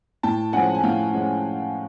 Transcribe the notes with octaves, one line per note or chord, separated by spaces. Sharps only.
A2 G5 A5
F3 G#3 C#4 F#5 G#5
G#5
A2 F5 G5
F3 G#3 C#4